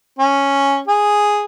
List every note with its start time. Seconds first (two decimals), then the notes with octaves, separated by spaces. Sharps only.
0.19 C#4
0.88 G#4